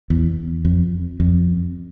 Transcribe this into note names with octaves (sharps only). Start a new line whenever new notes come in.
E2
F2
F2